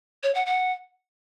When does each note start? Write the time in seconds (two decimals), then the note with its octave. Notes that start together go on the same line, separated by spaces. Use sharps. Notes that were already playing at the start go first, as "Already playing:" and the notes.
0.23 C#5
0.35 F#5
0.46 F#5